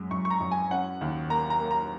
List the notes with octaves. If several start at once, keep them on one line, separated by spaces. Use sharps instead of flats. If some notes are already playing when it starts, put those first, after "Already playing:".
Already playing: F#2 G#3
F#2 C#6
C#6
A#5
F#2
G#5
C#4 F#5
D#2
A#3 A#5
A#5
A#3
A#5